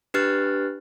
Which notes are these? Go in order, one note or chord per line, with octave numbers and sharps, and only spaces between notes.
D4 G4 B4 F6 F#6 A6